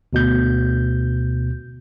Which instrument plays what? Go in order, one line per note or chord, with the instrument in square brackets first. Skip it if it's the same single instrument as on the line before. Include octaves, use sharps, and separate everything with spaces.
[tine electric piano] D2 B2 G6